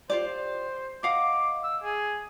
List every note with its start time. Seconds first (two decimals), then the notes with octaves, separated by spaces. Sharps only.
0.10 F4 G4 C5 D5
1.03 D#5 F5 F#5 D6
1.63 E6
1.84 G#4